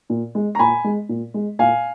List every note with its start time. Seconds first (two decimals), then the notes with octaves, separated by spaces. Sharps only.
0.10 A#2
0.35 G#3
0.55 A#5
0.59 A#2 G#5 B5
0.84 G#3
1.09 A#2
1.34 G#3
1.59 A#2 F5 G#5